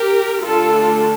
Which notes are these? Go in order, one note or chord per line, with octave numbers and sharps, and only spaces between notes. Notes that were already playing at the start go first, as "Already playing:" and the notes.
Already playing: G4 A#4
D3 A3 D4 F4 A4